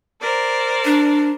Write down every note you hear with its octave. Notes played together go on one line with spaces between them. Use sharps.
A#4 C5 D5
D4